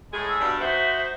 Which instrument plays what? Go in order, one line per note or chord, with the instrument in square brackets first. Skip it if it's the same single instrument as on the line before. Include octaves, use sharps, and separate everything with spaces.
[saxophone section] A2 G#3 G#4
[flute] E6
[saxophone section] G2 B2 D4
[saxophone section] D#4 F#4 C5 [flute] E5